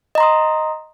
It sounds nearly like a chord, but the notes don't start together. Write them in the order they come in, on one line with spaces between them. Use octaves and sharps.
D#5 A#5 C6 D#6